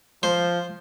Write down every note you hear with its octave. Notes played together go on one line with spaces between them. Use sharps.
F3 C5